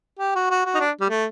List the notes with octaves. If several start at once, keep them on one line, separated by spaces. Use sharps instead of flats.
G4
F#4
F#4
F#4
D#4
D4
G3
A3